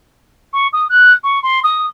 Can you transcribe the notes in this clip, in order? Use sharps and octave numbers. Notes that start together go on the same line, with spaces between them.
C#6
D#6
F#6
C#6
C6
D#6